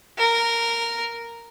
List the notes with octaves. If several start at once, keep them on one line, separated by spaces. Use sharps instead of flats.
A#4